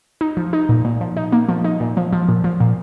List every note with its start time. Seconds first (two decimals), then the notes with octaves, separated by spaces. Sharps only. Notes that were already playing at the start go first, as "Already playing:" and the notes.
0.21 D#4
0.37 F3
0.53 D#4
0.69 A#2
0.85 A#2
1.01 F3
1.17 D#4
1.32 A#3
1.49 F3
1.64 D#4
1.80 A#2
1.97 F3
2.13 F3
2.29 A#2
2.44 F3
2.60 A#2